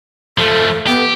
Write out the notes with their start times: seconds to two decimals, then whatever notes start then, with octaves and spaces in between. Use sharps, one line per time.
0.38 F3 A3 A4
0.87 B3 G4